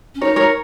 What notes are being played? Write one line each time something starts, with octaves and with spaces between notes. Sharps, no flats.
C#4
D#4 A#4 C#5
A#4 C#5